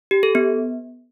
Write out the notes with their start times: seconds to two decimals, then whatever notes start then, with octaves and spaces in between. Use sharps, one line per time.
0.11 G4
0.23 A4
0.35 B3